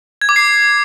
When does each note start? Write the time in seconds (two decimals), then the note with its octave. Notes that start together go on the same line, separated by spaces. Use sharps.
0.22 G#6
0.29 D6
0.36 C7